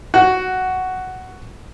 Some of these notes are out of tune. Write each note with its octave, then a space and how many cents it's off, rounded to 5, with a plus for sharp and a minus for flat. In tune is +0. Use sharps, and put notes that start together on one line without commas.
F#4 +5